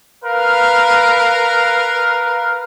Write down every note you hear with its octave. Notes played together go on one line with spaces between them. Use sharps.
A#4 B4 F5